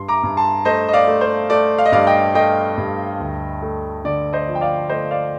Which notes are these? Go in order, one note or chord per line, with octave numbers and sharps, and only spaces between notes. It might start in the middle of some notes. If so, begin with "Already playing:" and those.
Already playing: G2 C6
A#5 D6
G2
A5 C6
A3 C5 D#5
D#5
D5 F5
A3
C5
A3 D5
F5
D#5
G2 D5 F5
D#5 G5
A3 D#5 G5
G2
D2
A3
D3 D5
C5 D#5
F3
G5
D5 F5
A3 C5 D#5
D5 F5